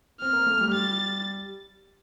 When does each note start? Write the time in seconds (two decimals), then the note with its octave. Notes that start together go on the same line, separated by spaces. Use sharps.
0.20 C4 F6
0.33 A#3
0.46 A3
0.61 G3
0.74 A6